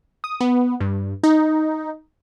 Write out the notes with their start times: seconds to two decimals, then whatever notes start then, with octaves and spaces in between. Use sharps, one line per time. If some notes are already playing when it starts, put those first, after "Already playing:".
0.24 D#6
0.41 B3
0.81 G2
1.23 D#4